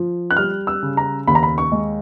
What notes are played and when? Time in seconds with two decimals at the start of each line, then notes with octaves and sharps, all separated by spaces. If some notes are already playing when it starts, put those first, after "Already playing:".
Already playing: F3
0.31 F#6
0.37 G3 F6
0.67 E6
0.83 C#3
0.97 A#5
1.27 D#2 B5
1.35 A#5
1.43 B5
1.58 C#6
1.72 G#3